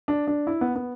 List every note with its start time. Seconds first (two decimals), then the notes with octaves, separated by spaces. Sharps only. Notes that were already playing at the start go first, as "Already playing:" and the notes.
0.08 D4
0.27 D4
0.47 E4
0.61 B3
0.76 B3